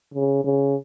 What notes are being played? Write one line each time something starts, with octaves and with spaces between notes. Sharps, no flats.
C#3
C#3